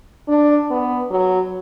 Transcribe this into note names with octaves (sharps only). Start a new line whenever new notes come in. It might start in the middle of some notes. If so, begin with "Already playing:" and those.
D4
B3
F#3